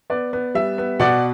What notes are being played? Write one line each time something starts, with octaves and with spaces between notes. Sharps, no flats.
B3 D5
B3
G3 E5
B3
B2 D5 F#5